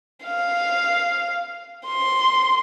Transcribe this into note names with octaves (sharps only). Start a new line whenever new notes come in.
F5
C6